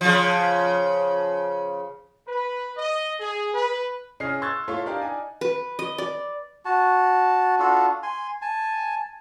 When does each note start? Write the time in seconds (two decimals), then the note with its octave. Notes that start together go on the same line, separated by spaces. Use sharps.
0.01 C#3 F3
2.28 B4
2.77 D#5
3.20 G#4
3.54 B4
4.20 C#3 C#4 G#4 D#5 F6 C7
4.42 C6 C#6 E6 F#6 G#6 A6
4.68 A3 F4 C#5 F5 C6
4.86 D4 D#4 G4 A#4 F5
5.01 D#4 D5 G#5
5.41 B4
5.79 D#5
5.98 D5
6.65 F#4 A5
7.59 D4 F4 F#4 A4
8.03 G#5 C6
8.42 G#5 A5